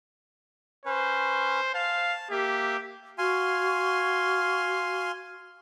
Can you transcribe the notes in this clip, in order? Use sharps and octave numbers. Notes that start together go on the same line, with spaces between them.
C#4 B4 C5
F5 A5
A#3 G4 E5
F#4 F5 G#5 C6